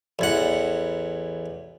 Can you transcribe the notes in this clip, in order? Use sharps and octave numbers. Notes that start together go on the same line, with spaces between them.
A1 E2 F#5